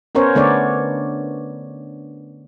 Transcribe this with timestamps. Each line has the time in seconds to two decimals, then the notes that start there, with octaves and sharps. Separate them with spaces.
0.15 B3 C#4 A#4 C5 C#5
0.35 D3 A3 B3 D4 C#5 D5